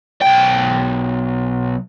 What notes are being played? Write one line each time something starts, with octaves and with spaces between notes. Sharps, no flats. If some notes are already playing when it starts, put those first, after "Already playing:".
B1 G5